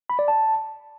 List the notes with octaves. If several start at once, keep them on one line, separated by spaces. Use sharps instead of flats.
B5
D5
A5